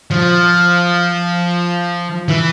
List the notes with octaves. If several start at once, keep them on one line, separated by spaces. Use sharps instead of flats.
F3
E3